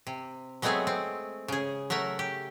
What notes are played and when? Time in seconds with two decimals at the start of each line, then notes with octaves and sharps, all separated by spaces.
0.07 C3
0.62 F#3 G#3 A3 B3 C4 G#4
0.87 C4
1.48 C#3 G#4
1.90 F#3 A3 A#4 E5
2.19 G4